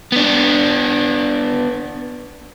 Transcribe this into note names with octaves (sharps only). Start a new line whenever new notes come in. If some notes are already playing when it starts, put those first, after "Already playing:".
B3 D4